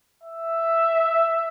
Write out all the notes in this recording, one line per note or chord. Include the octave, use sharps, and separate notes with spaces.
E5